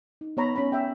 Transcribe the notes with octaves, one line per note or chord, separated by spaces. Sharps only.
D#4
B3 C#5 A#5 B5
C#4 B5
E5 G5